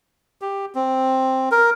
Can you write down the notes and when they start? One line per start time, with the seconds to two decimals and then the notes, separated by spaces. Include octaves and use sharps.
0.41 G4
0.75 C4
1.52 A#4